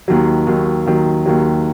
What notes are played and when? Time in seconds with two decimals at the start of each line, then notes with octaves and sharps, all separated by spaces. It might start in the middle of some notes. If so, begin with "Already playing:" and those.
0.08 D#2 D#3 F#3
0.47 D#2 D#3 F#3
0.86 D#2 D#3 F#3
1.26 D#2 D#3 F#3